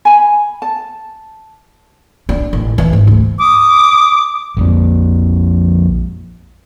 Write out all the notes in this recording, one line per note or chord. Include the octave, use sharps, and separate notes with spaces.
G#5 B5
A5
D4
A1
E3
G#2
D2
D6 D#6
A#1 F2 A#2